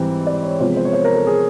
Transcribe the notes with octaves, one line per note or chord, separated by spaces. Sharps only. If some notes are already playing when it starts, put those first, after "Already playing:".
Already playing: G#2 E3 G3 C4
D5
C#5
C3 F3 G#3 B3 C5
C5
C#5
C5
A#4
A4
G#4